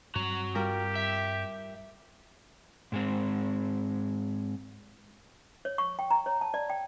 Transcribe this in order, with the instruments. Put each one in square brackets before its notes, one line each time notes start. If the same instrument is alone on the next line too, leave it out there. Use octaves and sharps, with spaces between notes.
[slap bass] G2 C4 [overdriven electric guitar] F#4 A#5
[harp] G3 F4 A#4 [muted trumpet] G4
[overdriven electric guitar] E5
[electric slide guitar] G#2 G#3 C4
[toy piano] C#5
C#6
G5
A#5
C#5
A5
D5
G5